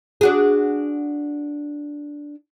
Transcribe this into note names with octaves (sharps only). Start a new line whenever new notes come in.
D4 F#4 G#4